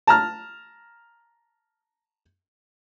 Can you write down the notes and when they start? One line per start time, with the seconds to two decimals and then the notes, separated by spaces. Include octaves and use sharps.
0.07 A5 A#5 F6